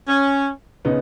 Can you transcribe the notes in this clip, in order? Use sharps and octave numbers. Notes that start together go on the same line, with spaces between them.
C#4
C#3 B3 D#4